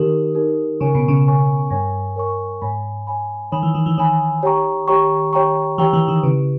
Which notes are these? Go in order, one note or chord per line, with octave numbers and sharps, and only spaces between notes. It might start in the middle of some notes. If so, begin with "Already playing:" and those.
Already playing: D#3 D#4 G4 A#4
D#4 G4 A#4
C#3 A#4 C#5 G#5 C#6
B2
C#3
A#4 C#5 G#5 C#6
G2 A#4 C#5 G#5 C#6
A#4 C#5 G#5 C#6
G#2 C#5 G#5 B5
C#5 G#5 B5
D#3 C#5 G#5 B5
E3
D#3
E3
D#3 C#5 G#5 B5
G4 C#5 G5 A#5 C#6
G4 C#5 G5 A#5 C#6
G4 C#5 G5 A#5 C#6
E3 G4 C#5 G5 A#5 C#6
E3
D#3
C#3 E4 G4 B4